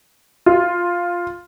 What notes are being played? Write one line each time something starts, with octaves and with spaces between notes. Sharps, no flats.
F4